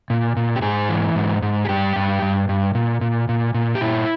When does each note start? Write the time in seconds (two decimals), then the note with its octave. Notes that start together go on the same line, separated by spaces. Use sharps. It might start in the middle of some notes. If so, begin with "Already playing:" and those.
0.10 A#2
0.36 A#2
0.56 G4
0.62 G#2 G#4
0.89 E3
1.16 G#2
1.42 G#2
1.65 G#4
1.69 G2 G4
1.96 G2
2.22 G2
2.49 G2
2.75 A#2
3.01 A#2
3.29 A#2
3.54 A#2
3.75 G4
3.81 A#2 E4